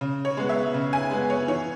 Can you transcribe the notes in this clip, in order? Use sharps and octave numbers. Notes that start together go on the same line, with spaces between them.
C#3
C#5
G#3 B3
E5
C#3
G#5
G#3 B3
C#5
E3 C#5